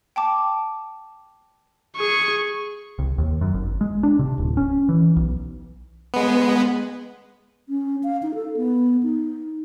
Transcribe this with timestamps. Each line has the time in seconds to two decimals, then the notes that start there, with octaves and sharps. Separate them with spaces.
0.16 G5 A5 D6
1.97 G#4 C#6
2.99 C2
3.18 D#2
3.41 F#2
3.54 G#1
3.81 G#3
4.03 D4
4.19 C3
4.38 D1
4.57 C#4
4.89 E3
5.16 B1
6.14 G#3 B3
7.69 C#4
8.03 F5
8.23 D#4
8.34 A4
8.57 B3
9.03 D#4